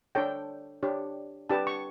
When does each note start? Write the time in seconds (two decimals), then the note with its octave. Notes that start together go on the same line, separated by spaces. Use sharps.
0.15 D4 A4 C#5 G5
0.83 D4 G4 C#5
1.49 D4 G4 B4 A5
1.67 C#6